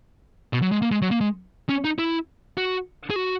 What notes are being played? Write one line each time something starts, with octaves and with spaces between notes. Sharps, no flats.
B2
F#3
G#3
A#3
G#3
F#3
A#3
G#3
C#4
D#4
E4
F#4
G#4
F#4